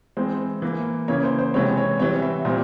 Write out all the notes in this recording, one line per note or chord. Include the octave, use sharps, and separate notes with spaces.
E3 G#3 C4 C5
E3 A#3
C#3 E3 A#3 C#5
C5
C5
C3 E3 G#3 C4 C#5
C#5
E3 G3 C4 C#5
E5
A#2 G3 C4